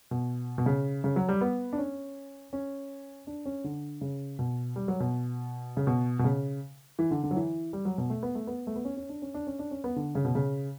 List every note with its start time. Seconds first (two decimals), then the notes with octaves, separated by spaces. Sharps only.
0.11 B2
0.58 B2
0.66 C#3
1.04 C#3
1.16 F#3
1.29 G3
1.41 B3
1.73 D4
1.78 C#4
2.53 C#4
3.27 D4
3.46 C#4
3.64 D3
4.01 C#3
4.39 B2
4.76 G3
4.88 F#3
5.00 B2
5.77 C#3
5.87 B2
6.19 B2
6.24 C#3
6.99 E3
7.11 D3
7.23 D3
7.31 F#3
7.36 E3
7.73 G3
7.85 F#3
7.98 B2
8.10 A3
8.23 B3
8.35 A3
8.47 B3
8.67 A3
8.76 B3
8.85 C#4
8.97 C#4
9.09 D4
9.22 C#4
9.34 D4
9.47 C#4
9.59 D4
9.71 C#4
9.84 B3
9.96 D3
10.15 C#3
10.25 B2
10.35 C#3